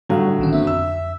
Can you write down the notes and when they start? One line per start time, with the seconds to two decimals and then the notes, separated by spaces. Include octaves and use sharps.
0.09 A2 D3 F#3 G3 F5
0.39 A#1 D#3 C#4
0.52 A#3 C4 D4 E5
0.67 F2 E6